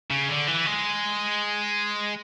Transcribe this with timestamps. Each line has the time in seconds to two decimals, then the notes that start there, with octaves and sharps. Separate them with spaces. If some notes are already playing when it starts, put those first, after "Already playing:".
0.11 C#3
0.29 D3
0.48 E3
0.67 G#3